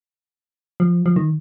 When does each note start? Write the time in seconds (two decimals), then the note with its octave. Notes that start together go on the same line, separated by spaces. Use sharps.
0.80 F3
1.06 F3
1.16 D#3